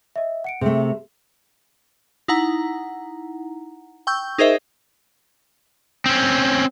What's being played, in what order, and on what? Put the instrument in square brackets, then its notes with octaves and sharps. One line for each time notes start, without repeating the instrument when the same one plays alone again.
[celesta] D#5 E5
F#5 C#7 D7
[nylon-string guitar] C3 A3 [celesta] G#4
[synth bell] D#4 E4 F#5 A#5
G5 C#6 E6 G6
D#4 G#4 A#4 C5 D#5 E5
[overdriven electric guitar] C4 C#4